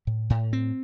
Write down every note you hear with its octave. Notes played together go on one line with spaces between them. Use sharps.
A2
A2
C4